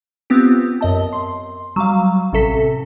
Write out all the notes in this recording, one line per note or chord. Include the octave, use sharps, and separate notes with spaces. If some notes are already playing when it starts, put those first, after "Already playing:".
B3 C4 F4 G4
F#2 D#5 A5
C6
F#3 G3 F5
A1 C3 A4 B6